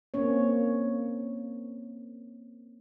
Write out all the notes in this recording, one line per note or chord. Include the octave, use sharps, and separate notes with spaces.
A#3 C4 C#4 C#5